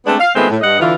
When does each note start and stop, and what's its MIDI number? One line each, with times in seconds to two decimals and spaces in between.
0.06 0.15 56
0.06 0.15 57
0.06 0.15 59
0.06 0.15 60
0.06 0.15 62
0.19 0.29 77
0.35 0.46 51
0.35 0.46 56
0.35 0.46 57
0.35 0.46 59
0.35 0.46 60
0.35 0.46 65
0.49 0.57 45
0.61 0.79 43
0.61 0.79 75
0.61 0.79 78
0.80 0.94 50
0.80 0.94 52
0.80 0.94 65